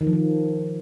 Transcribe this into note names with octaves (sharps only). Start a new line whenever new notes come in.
D#3
F3
D#3